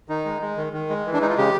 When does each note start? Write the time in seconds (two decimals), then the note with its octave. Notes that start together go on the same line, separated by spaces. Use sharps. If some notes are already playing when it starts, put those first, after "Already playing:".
0.09 D#3 D#4
0.25 G#3
0.41 G#3
0.57 D#3
0.73 D#3
0.90 G#3
1.06 E3
1.14 D4
1.21 G#3 D#4
1.29 F4
1.37 C#3 G4